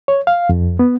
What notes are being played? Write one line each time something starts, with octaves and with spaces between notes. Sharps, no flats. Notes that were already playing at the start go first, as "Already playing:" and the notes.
C#5
F5
F2
B3